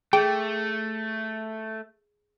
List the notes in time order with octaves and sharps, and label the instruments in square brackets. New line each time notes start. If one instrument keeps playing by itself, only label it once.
[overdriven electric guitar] A3 [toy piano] G#4 [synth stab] G5